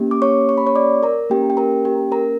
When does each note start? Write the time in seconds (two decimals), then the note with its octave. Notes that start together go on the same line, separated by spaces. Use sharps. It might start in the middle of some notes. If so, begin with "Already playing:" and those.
Already playing: A#3 C#4 G4
0.11 D6
0.22 C#5 C#6
0.49 C#6
0.58 B5
0.66 C#5 C#6
0.75 D5 D6
1.03 A#4 A#5
1.30 A#3 C#4 G4 G5
1.50 G5
1.57 A#4 A#5
1.85 G4 G5
2.12 A#4 A#5